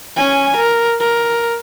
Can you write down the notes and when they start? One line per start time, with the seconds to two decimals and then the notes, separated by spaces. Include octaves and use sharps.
0.17 C#4 G#5
0.56 A#4
1.00 A#4